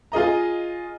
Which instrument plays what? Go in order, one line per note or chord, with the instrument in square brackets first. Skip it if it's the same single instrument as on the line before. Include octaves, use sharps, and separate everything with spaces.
[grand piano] F4 G#4 D#5 A#5